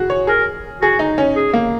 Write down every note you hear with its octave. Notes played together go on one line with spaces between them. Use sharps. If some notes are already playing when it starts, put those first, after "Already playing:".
Already playing: F#4 G#4
C#5
G#4 A#4
F#4 G#4
D#4
C#4
G#4
A#3